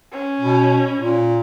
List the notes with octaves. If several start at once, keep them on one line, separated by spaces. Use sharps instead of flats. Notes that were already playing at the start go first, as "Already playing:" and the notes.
C#4
B2
A#2